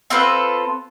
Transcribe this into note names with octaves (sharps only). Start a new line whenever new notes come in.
C4 F4 A4 B4